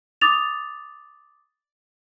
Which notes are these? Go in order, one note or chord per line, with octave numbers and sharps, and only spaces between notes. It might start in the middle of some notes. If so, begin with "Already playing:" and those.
D6 D#6 A6 F7